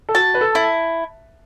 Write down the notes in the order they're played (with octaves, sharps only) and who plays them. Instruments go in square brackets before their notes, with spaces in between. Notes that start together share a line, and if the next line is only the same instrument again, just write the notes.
[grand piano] A4
[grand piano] F#4 [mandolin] A5
[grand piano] B4
A4
[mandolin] E4